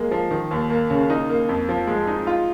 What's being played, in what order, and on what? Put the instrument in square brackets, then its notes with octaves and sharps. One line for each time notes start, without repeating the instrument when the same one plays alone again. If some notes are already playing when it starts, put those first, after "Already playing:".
Already playing: [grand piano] G#3 A#3
F3
D#3
D#2
A#3
C#3
D#4
A#3
F2
F3
G#3
D#4
F4